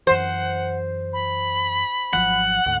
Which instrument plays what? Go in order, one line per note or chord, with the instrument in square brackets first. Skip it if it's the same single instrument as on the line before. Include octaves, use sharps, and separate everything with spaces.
[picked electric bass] F#2 E3 [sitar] C5 [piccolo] F#5
[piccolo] B5
[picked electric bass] G#1 F3 F#3 [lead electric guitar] F#5
[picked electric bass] D2 G#2